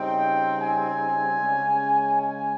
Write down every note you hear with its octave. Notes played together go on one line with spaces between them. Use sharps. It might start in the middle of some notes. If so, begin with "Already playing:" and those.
Already playing: C#3 G3 C4 D#4 G5
G#5
C#3 G#3 C#4
G#5